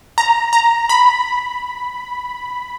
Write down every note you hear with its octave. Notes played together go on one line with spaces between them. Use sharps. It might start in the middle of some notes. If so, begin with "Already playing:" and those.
A#5
A#5
B5